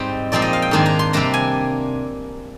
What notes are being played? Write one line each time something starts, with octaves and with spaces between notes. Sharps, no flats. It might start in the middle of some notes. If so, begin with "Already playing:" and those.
Already playing: G#2 G3 C4 D#4
A#2 F3 G#3 C4 D#4 D5
D#5
F5
G5
G#2 D#3 A#3 D4 G#5
A#5
C6
C3 G3 A#3 D4 A#5
G#5